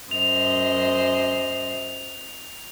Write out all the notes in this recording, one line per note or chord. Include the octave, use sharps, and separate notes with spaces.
F#2 C5 D#5 F7